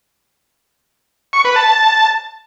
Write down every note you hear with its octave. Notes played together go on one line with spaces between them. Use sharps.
C#6
B4
A5